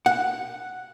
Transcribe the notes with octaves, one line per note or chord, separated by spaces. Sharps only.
F#5